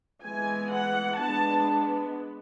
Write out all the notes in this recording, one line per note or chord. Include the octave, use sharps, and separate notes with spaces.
E3 G#3 B3 G#5
F#5
G#3 B3 D4 A5